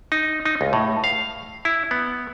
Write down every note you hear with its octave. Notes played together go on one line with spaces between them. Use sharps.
D#4
D#4
C#2
A2
F5
E4
B3